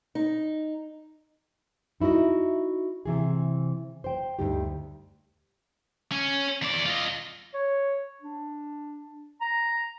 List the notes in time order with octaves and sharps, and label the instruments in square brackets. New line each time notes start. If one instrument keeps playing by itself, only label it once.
[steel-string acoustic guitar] D#4
[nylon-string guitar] D#4 E4 F#4 A#4 D#5
C3 E3 G#4
C5 G5
D2 G2 D#4 G4
[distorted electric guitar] C#4
E2 D5
F4 D#5
[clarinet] C#5
D4
A#5